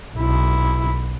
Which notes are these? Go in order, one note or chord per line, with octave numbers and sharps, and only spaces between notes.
B1 E4